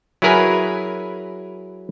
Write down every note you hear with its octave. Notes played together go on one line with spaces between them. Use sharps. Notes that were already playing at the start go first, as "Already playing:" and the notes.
F#3 E4 G#4 A#4 B4 G#5